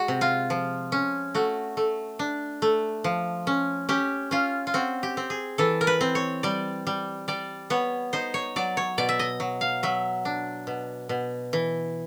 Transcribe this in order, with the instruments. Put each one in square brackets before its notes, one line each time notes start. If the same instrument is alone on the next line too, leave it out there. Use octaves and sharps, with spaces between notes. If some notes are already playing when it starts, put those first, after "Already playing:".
Already playing: [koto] G#3 F#4
C3
F4
F3
C#4
A3 F#4
A3
D4
A3
F3
C#4
C#4 G4
C#4 F4
F4
C4 F#4
G4
C4
G#4
E3 A4
A#4
B4
C4
C#5
G3 D5
G3
G3 D5
B3 C#5
D#4 C5
C#5
F#3 D5
C#5
B2 D5
E5
D#5
F#3
F5
F#3 E5
D4
B2
B2
E3